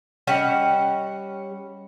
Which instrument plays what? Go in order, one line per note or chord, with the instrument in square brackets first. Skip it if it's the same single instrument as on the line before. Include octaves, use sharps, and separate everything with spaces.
[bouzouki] G3 C#4 D#5 F#5